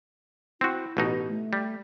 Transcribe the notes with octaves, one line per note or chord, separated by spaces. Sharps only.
C4 E4 F#4
A1 B2 D#4
A3
G3